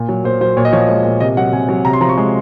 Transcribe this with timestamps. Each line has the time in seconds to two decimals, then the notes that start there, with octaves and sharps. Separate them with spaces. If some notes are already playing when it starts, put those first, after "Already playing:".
Already playing: A#2
0.09 F#3
0.24 A#2 C5
0.41 F#3 C5
0.57 A#2 C#5
0.65 D#5
0.73 F3 C#5
0.81 D#5
0.88 G#3 C#5
1.05 A#2
1.20 C3 D#5
1.37 F#3 F#5
1.53 C3 G#5
1.69 F#3
1.85 C3 A#5
1.93 C6
2.01 F3 A#5
2.09 C#6
2.18 G#3